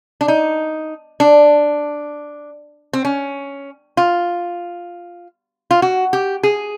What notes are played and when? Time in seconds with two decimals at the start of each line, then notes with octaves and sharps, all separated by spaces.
0.21 D4
0.28 D#4
1.20 D4
2.93 C4
3.05 C#4
3.97 F4
5.71 F4
5.82 F#4
6.13 G4
6.43 G#4